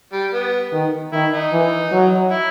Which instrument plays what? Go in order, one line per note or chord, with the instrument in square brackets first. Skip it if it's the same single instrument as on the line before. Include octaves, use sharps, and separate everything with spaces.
[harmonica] G3
B3
[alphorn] D#3
[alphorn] D#3 [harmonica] E4
[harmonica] D#4
[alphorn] E3
F#3
[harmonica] E4